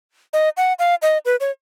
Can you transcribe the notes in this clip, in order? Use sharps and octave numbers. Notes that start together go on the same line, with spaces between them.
D#5
F#5
F5
D#5
B4
C#5